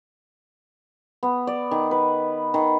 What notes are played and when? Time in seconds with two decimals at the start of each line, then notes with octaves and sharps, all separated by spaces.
1.23 B3
1.47 D5
1.71 D#3
1.91 B4
2.54 D#3